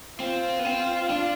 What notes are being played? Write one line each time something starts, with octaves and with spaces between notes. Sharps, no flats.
C4 F4
B3
C4
D4